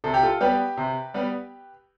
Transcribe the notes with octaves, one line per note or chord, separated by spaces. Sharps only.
C3 A4
G4
F4 A4
G3 B3 G4 B4
C3
G3 B3